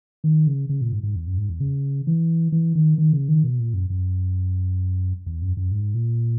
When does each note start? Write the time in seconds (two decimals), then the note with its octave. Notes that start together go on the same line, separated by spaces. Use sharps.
0.24 D#3
0.47 C#3
0.69 C#3
0.81 A#2
0.92 G#2
1.03 G#2
1.16 E2
1.27 F#2
1.38 G#2
1.49 E2
1.60 C#3
2.07 E3
2.52 E3
2.75 D#3
2.98 D#3
3.13 C#3
3.28 D#3
3.44 B2
3.59 A#2
3.74 F#2
3.90 F#2
5.26 E2
5.42 F#2
5.57 F#2
5.72 G#2
5.94 A#2